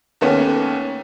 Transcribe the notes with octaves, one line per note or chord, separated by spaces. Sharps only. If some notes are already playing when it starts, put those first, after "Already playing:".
D#2 D#3 A3 B3 C#4